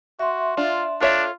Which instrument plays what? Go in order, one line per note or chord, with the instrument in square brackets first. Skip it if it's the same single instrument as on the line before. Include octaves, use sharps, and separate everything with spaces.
[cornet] F#4 [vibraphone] E5 C6
[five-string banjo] D4 [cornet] F4
[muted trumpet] D4 [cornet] F4 [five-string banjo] A4 C#5 E5